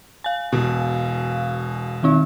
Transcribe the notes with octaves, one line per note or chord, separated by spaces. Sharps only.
F5 G#5
E1 B2
D#3 C4 D#4